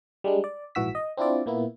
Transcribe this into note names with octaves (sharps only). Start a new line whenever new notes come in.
G3 G#3 D4
D5
A#1 G#2 E3 F#4 E6 B6
D#5
C4 D4 E4 F4 D5
A#2 A#3 B3 E4